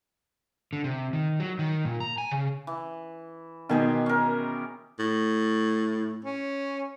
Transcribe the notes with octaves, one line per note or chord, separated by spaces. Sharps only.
D3
C3
D#3
F#3
D#3
A#2
A#5
G#5
C#3
E3
B2 D#3 G4 G#4 C5
C#4 A#4
A2
C#4